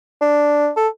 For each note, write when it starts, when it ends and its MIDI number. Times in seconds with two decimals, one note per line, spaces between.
0.21 0.69 62
0.77 0.88 69